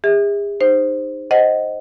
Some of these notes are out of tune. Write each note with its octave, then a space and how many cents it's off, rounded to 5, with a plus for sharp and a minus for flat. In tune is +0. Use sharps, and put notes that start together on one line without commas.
G#4 -40 E5 -25
D#4 -20 C5 +0
C5 +0 D#5 +0 F#5 +15